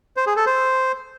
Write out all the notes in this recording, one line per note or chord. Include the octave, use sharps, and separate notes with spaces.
C5
G#4
A4
C5